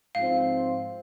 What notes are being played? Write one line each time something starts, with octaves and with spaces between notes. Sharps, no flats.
G#2 F3 C4 F4 F5